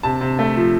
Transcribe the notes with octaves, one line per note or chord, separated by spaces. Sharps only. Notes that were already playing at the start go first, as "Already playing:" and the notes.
C3 A5
C3
A3
F3